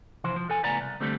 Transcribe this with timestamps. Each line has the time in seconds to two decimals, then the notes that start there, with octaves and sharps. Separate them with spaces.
0.24 C3 E3 F3 C5
0.36 F3
0.48 E2 A4 G#5
0.63 C#2 A2 B3 D5 G#5 A#5
0.81 C2
1.00 D2 G#2 D3 G3 A3 C4